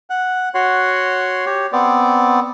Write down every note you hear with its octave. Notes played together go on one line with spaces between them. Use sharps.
F#5
F#4 C#5 F#5 C6
G4 C#5
B3 C4 D5